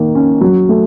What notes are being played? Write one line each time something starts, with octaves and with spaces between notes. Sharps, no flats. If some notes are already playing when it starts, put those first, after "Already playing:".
Already playing: D#3 A#3
C#4
F#3
A3